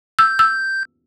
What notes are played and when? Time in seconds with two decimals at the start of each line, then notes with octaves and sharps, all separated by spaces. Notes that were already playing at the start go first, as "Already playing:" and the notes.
0.19 E6 G6
0.39 E6